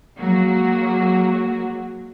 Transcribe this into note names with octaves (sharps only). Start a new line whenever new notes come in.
F#3 G#3 A#3 F#4